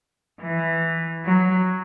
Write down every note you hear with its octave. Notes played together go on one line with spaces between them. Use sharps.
E3
F#3